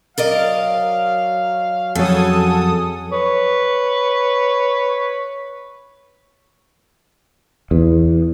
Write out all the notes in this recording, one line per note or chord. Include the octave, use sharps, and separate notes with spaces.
F#3 A#4 D5 D#5 F5
F2 C#3 F#3 G#4 A4 F#5 G#5 D#6
B4 C#5
E2